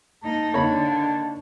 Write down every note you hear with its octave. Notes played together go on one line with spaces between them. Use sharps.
A#3 D#4 A5
D3 A#3 D#4 C#5 B5